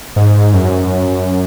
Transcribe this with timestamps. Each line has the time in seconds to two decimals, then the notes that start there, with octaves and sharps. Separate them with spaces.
0.16 G#2
0.54 F#2